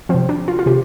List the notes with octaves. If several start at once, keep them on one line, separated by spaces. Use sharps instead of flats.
F3 C4
C3
D4
F4
F4
C3 G4